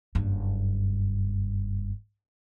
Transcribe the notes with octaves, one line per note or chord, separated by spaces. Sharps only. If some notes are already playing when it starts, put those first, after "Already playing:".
F#1 G2